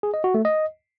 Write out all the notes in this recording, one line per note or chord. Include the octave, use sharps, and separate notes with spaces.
G#4
D#5
F#4
A3
D#5